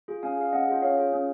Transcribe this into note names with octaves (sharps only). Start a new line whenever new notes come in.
F4 G#4
C#4 F5 G#5
G#4 F5
C#4 D#5 F#5
F4 G#4
C#4 C#5 F5
F4 G#4
C#4